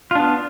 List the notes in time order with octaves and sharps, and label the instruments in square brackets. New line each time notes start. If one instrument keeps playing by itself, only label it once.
[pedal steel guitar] F4
D4
B3